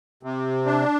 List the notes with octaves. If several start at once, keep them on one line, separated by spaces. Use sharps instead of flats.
C3
D4